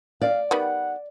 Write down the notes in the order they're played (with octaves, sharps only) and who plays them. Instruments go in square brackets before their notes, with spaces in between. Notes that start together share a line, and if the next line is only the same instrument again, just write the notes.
[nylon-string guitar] D5 [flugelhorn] F5
[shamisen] D#3 G3 B3 [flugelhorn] F#5